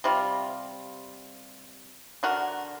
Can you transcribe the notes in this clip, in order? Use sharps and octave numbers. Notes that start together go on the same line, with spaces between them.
C3 G3 F4
D3 F#4 A#4